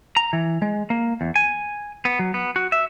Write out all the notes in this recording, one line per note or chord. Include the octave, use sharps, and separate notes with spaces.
A#5
E3
G#3
A#3
E2
G#5
B3
F#3
B3
F#4
E5